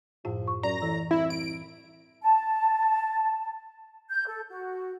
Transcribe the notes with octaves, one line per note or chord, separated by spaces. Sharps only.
F#2 A2 F3 F4
C#6
F#2 D5 A#5
A2 E3
C2 E4
D7
A5
G6
A4
F#4